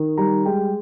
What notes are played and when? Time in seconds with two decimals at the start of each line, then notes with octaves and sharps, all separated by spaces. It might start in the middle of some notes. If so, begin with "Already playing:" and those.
Already playing: D#3
0.17 G3 A#5
0.45 G#3 G5